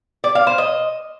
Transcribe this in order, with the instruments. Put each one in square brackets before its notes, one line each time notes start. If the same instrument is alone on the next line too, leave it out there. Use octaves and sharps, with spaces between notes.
[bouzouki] D5
F5
C5
D#5